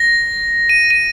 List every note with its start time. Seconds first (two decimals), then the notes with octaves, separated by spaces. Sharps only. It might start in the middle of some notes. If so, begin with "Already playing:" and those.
Already playing: A#6
0.69 D#7
0.91 D#7